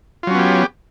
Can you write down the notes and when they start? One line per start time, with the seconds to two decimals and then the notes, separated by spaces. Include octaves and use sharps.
0.23 F4
0.27 F#3
0.31 C#4
0.35 B3
0.39 G4